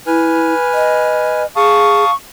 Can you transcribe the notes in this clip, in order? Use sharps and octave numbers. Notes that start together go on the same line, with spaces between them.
E4 B4 G#5 F6
D#5
G#4 F5 A5 C#6 D#6